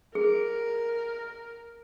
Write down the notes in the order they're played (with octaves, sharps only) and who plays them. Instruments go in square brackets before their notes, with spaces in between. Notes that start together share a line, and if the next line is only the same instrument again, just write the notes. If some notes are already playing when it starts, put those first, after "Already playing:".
[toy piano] G#4 [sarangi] A#4